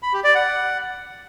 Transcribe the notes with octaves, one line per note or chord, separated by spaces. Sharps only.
B5
G4
D5
F#5